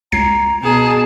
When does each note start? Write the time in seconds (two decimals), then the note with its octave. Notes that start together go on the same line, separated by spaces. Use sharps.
0.12 C#2 A#5 G#6 C7
0.63 B2 G#4 A5